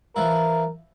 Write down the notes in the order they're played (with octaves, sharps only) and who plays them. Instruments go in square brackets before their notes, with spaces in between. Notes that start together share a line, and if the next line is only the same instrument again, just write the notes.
[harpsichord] E3 F3 E4 [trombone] A#4